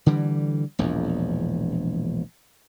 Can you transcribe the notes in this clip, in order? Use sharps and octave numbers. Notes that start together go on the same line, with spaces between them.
D3 E3 G3
E1 A#1 E2